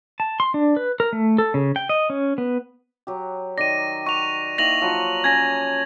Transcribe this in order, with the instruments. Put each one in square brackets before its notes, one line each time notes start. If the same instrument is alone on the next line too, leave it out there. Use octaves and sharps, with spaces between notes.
[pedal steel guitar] A5
C6
D4
B4
A#4
A3
A4
C#3
G5
D#5
C#4
B3
[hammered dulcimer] F#3 G4
[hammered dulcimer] D#3 D5 [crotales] A#6 D#7
[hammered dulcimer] F#5 [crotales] C#6 F7
[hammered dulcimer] D#3 A#3 E4 [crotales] A#6 F7 F#7
[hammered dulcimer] F3 F#3 F#5
[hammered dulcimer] C#4 [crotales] G#6 A#6